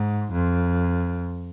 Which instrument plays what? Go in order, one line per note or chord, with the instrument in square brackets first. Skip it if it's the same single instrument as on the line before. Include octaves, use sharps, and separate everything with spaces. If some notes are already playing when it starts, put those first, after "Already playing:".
Already playing: [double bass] G#2
F2